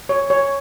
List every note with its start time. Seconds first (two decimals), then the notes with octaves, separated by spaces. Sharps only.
0.09 C#5
0.30 C#5